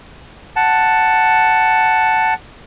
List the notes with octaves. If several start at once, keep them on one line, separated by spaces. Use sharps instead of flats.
F#5 A5